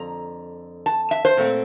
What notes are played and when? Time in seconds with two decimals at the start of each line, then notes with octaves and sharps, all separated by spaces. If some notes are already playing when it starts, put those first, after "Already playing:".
Already playing: F2 D3 A#5
0.86 A5
1.11 E5
1.25 C5
1.37 A#2 A3 C4